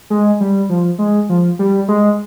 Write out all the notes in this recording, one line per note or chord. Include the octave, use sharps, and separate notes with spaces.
G#3
G3
F3
G#3
F3
G3
G#3